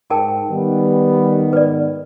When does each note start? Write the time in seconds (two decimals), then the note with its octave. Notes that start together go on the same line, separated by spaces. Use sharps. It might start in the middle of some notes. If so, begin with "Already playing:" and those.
0.10 G#2 A#4 G5 A5
0.50 D#3 G3 B3
1.53 G#2 B4 D5